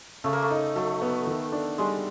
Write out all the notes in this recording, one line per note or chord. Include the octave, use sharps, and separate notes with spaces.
C#3 A3
A#3
A3
D#4
F#3 A3
B3
D#3
D4
G3 G#3